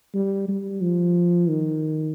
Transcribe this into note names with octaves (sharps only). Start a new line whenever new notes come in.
G3
G3
F3
D#3